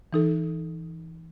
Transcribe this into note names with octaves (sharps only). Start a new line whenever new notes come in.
E3 D#4 A4